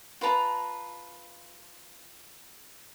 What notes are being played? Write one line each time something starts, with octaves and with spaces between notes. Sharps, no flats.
F4 B4 A5 A#5